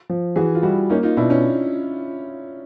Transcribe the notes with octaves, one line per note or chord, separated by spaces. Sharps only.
F3
E3 F#4 G#4
F4
G3 E4 F#4
A#3 C#4 D#4
D#4 F4
B2 D4 E4
C#4 D#4